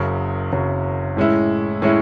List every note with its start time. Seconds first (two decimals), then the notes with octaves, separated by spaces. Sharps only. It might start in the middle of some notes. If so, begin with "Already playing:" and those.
Already playing: F#1 F#2 C#3 F#3
0.52 F#1 F#2 C#3 F#3
1.17 A2 G#3 C#4 E4
1.82 A2 G#3 C#4 E4